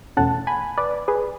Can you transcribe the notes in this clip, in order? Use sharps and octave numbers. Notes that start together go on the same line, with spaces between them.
E2 B2 A3 C#4 F#5 A5
G#5 B5
B4 D5
G#4 B4